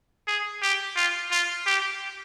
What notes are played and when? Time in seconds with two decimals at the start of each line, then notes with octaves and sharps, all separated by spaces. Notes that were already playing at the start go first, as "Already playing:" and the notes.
0.27 G#4
0.62 G4
0.96 F4
1.31 F4
1.66 G4